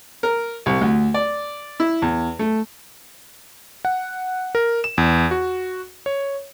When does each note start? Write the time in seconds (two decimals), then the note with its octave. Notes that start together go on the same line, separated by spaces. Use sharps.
0.23 A#4
0.66 C2
0.81 D2
1.14 D5
1.80 E4
2.02 E2
2.39 A3
3.85 F#5
4.55 A#4
4.84 E7
4.98 E2
5.31 F#4
6.06 C#5